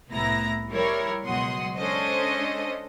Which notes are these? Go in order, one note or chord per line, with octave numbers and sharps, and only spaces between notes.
C2 A2 B3 E4 A#5 A#6
G3 E4 A#4 C#5
C#2 B2 F#3 F#5 C6 D#6
G#3 C#4 D4 A4 C5 D#5